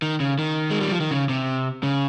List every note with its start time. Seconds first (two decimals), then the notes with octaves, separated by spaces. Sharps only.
0.02 D#3
0.20 C#3
0.39 D#3
0.70 G#3
0.81 G3
0.91 F3
1.01 D#3
1.11 C#3
1.29 C3
1.83 C#3